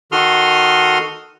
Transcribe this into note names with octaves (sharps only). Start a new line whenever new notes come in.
D#3 F#4 A4 C6 D#6 F6